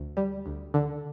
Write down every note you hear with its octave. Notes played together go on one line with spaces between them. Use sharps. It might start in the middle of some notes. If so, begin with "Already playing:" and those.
Already playing: D2
G3
D2
D3